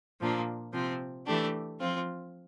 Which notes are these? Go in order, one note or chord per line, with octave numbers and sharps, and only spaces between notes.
A#2 F3 A#3 D4
C3 F3 C4
E3 A3 D4 G4
F3 C4 F4